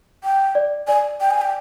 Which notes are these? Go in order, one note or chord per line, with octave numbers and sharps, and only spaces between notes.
G5
D5
D5 G#5
G5
G#5
G5